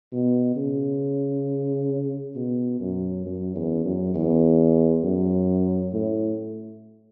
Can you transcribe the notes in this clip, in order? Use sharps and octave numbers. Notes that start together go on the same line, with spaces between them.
B2
C#3
B2
F#2
F#2
E2
F#2
E2
F#2
A2